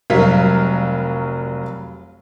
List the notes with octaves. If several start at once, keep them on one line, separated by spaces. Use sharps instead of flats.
F1 F#3 G3 A#4 F5 B6